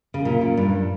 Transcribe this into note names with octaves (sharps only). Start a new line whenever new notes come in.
C#3
A#2
A#2
G2